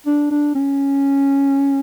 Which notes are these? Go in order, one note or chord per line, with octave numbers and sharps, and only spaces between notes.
D4
D4
C#4